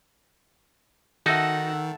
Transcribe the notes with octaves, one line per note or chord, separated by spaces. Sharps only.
D#3 D#4 F#4 A4 E5 F#5